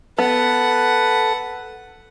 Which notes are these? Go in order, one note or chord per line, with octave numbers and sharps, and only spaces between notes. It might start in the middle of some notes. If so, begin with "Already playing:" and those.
B3 A4 B4 F#5 A5